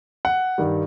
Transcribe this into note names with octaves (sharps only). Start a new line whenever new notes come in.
F#5
G2 D#3 G3